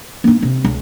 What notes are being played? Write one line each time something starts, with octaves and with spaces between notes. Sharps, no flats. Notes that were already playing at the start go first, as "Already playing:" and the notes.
A#3 D#4
C3
C#2